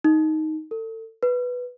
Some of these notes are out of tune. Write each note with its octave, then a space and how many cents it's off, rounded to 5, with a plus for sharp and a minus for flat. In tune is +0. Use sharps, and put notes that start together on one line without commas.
D#4 +5
A4 +30
B4 +0